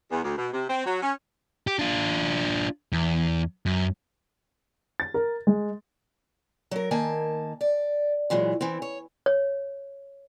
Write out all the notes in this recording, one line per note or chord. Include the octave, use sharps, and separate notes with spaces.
E2
D2
B2
C3
C4
F#3
C#4
G4
D4 F4
E2
F#2
A6
A#4
G#3
F#3 A#4
D#3 A#3 G#5 A5
D5
A#2 E3 F#3 G#3
E3 C4
C#5
C#5